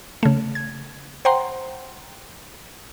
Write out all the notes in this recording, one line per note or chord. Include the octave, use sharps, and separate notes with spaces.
C#3 A3
G#6
C5 F#5 G5 A#5 C6